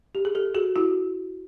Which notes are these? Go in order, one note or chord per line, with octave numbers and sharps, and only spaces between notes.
G4
G#4
G4 A4
F#4 G#4
E4 F#4